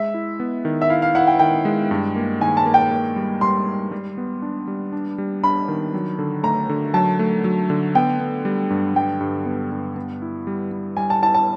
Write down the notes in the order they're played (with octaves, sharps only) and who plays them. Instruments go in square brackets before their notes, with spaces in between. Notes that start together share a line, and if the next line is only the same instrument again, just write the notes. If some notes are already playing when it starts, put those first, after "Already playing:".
Already playing: [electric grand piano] G#3 [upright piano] E5
[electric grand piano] E4
B3
D#3
[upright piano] E5
[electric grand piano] E4 [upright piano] F5
[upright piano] F5
[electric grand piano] E4 [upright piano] F#5
[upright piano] G5
[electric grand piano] D#3 [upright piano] G5
[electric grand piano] G#3
G2
A#3
[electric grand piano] D#3 [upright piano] G#5
[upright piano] A5
[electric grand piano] A#3
[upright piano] G5
[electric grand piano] A#3
G3
[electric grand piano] G3 [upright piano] C6
[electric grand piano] G3
G3
B3
D4
G3
D4
G3
[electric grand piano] D4 [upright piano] B5
[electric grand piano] D#3
F#3
D3
[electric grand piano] A3 [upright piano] A#5
[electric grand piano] D3
[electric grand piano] F#3 [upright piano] A5
[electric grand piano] A3
F#3
D3
[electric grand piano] B3 [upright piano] G5
[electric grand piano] B3
G3
G2
[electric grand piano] G3 [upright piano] G5
[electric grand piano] G2
B3
G2
B3
E4
G3
G3
[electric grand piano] G3 [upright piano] G#5
[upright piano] A5
[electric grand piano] E4 [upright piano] A5
[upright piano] A5